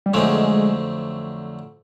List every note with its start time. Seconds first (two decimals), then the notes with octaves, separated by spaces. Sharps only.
0.06 G3
0.14 F2 D3 F#3 G#3 A3 C4